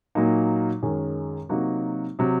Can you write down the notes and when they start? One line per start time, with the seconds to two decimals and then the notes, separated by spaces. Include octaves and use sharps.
0.15 A#2 F#3 A#3 D#4
0.82 F#2 D#3 G#3 C#4 G#4
1.49 C3 F#3 A#3 D#4 F#4
2.19 C3 F#3